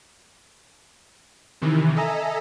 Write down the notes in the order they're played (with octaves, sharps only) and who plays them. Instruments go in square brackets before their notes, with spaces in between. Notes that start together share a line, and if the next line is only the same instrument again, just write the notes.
[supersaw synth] C3 D#3 E3
A4 D#5 E5 G#5 A#5